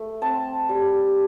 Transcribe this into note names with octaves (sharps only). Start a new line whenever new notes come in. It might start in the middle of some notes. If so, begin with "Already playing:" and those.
Already playing: A3
C4 A5
G3